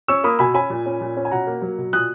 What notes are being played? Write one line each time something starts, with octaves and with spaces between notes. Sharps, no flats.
C#4 C#6 E6
A#3 B5 D#6
B2 G#5 B5
C#4 G#5 B5
A#2
C#4
A#2
C#4
G#5
B2 F#5 A#5
A#3
F#3
B2
A#2 D#6 F#6